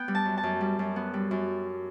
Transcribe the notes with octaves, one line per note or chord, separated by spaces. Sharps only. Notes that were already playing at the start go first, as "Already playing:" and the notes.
Already playing: B3 G5
G3
A5
F#2
A5
F#2
G3
F#2
B3
G3
F#2